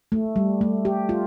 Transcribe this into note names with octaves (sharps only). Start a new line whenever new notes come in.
A3
G3
A3
G4
F4